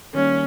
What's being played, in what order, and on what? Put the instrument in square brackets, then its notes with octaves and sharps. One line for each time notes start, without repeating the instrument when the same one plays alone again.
[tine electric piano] D#3 G3 A#3 [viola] C#4